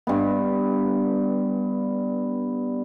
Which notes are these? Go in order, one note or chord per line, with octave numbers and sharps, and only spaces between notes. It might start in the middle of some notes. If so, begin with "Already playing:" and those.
G2 B3